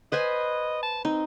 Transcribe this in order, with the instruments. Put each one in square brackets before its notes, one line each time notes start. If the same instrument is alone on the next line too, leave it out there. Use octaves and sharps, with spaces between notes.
[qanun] B4 C5 G#5 [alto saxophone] D#5
[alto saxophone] A5
[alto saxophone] C4 [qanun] D#4